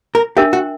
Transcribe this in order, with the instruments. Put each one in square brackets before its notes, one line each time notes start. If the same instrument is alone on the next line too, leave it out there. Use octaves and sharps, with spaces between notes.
[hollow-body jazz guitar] A#4
[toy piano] D4 A#4 E5 G5 [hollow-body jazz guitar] G4
[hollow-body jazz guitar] F#4